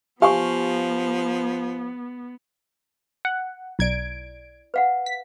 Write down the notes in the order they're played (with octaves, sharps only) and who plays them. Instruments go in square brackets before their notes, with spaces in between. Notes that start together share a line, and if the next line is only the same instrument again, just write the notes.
[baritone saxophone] F3 [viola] B3 [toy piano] G4 G#5 C#6 [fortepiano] F5
[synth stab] F#5
[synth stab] B1 G#6 D7 [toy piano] E4 D5
[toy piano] B4 F5 F#5
[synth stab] B6